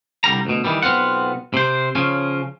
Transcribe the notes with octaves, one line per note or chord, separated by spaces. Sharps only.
C2 D3 G3 A#5
D2 B2
D#3 E3 G3
B1 B3 C4 F4 F#5
C3 C5
C#3 F3 C#4